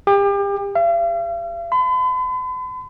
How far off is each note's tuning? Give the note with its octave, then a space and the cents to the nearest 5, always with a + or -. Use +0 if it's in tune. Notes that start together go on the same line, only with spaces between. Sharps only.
G4 +35
F5 -45
B5 +45